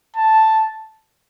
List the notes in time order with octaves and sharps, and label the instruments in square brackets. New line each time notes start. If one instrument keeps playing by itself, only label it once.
[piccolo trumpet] A5